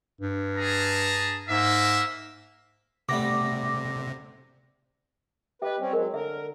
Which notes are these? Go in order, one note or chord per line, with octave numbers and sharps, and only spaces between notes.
G2
G#4 A5 A#5
G#2 A#3 E5
C3 G3 A3 B3 D6 A#6
G4 B4 D#5 E5
G3 C4 C#4
F#3 G#3 A#4
D3 A#4 E5